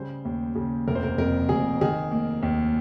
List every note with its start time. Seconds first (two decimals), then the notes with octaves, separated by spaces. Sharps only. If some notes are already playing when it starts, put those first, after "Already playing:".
Already playing: C#3 G3 C5
0.25 D#2
0.55 C#3
0.88 F1 A#4
0.95 C5
1.03 A#4
1.18 F2 A#4
1.49 F1 G#4
1.81 D#3 G#4
2.11 A#3
2.43 D#2